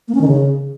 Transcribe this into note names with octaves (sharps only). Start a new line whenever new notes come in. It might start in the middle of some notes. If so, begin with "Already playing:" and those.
A#3
C#4
D#3
C#3